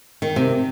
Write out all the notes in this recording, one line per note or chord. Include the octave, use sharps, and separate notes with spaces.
D#3
C3